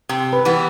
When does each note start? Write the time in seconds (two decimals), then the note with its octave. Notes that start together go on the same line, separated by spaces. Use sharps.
0.09 C3
0.33 B4
0.45 E3 G3 B3